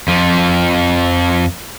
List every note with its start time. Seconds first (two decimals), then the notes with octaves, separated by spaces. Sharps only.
0.08 F2 F3